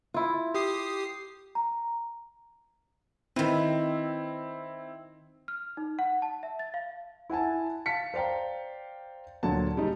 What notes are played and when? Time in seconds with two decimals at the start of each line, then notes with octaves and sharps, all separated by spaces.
0.14 E4 F4
0.55 G4 D#6 C7
1.55 A#5
3.36 D#3 C4 E4 B4
5.48 F6
5.77 D#4
5.99 F#5
6.22 A5
6.43 E5
6.59 A6
6.74 F5
7.30 E4 F#5 G#5 A5
7.86 F5 A5 B6 C#7
8.14 C5 D5 F5 G5 A#5
9.43 D2 A#2 F#3 A5
9.76 C#3 G3 D#4